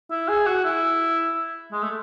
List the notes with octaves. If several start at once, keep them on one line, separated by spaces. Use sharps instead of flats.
E4
G#4
F#4
E4
G#3
A3